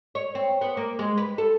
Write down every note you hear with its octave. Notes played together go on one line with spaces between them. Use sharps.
C#5
C4
B3
A#3
G#3
B4
A4